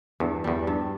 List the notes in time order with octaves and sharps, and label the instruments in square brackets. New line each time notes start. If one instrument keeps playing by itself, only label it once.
[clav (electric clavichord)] E2 [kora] G2
[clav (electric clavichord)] E2 [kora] G3
[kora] G2